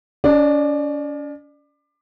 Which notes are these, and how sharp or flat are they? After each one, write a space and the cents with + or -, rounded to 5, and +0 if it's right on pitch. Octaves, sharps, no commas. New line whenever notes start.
C#4 +45 D5 +25